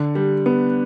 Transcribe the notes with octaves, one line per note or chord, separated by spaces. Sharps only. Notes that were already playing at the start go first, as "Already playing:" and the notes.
Already playing: D3
G3
B3